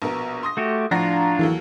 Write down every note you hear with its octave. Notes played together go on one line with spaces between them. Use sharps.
A#1 B2 A#4
C6 D#6 A#6
A3 F#4 G4
A2 F3 D4 F4 F#5 A#5 A#6
D#2 E3 F#3 A4